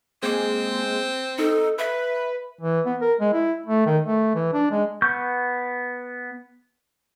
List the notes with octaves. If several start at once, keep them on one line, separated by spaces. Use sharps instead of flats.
G#3 A#3 C4
D#4 A4
B4 E5
E3
B3
A#4
G#3
E4
A3
D#3
A3
E3
D4
G#3
B3 C#6 G6